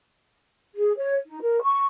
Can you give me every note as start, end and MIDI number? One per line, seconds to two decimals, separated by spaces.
0.75 0.93 68
0.98 1.16 73
1.26 1.40 63
1.41 1.60 70
1.62 1.84 85